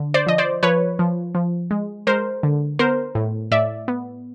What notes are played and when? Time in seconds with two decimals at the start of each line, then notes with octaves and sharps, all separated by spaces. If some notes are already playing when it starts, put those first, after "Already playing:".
Already playing: D3
0.14 C5 D5
0.27 F3 D#5
0.38 C5 D5
0.63 F3 B4 C#5
0.99 F3
1.35 F3
1.71 G#3
2.07 G#3 A#4 C5
2.43 D3
2.79 B3 A#4 C5
3.15 A2
3.51 A2 D5 E5
3.88 B3